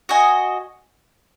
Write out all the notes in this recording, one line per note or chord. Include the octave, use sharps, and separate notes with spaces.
F#4 D#5 G#5